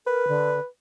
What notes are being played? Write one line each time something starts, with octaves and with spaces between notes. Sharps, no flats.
A#4 B4
D3